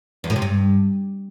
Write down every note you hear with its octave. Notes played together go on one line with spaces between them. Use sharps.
E2
A2
C3
G2